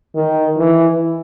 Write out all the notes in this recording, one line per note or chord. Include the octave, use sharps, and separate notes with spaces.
D#3
E3